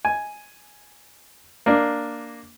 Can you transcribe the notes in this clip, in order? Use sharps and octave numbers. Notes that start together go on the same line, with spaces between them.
G#5
A#3 D4